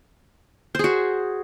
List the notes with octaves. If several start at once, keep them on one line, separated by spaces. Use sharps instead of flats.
F#4 G#4 C5